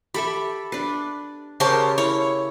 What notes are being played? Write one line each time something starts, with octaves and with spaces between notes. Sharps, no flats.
G4 A4 E5 B5
D4 B4
C#3 G4 A#4 C5 C#5 A5
E4 C#5